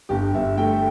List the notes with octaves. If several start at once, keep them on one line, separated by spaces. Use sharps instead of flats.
G1 G4
G1 E5
A3 G5